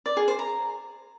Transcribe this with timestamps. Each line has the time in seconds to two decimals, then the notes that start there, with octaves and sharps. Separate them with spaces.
0.06 D5
0.17 G#4
0.28 C5
0.39 A#5